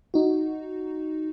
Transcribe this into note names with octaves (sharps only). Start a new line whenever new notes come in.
D#4 F#4